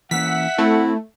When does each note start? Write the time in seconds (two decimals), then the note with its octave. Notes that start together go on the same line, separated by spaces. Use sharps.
0.11 E3 A#3 C#4 E5 F#5 B6
0.58 A3 C4 E4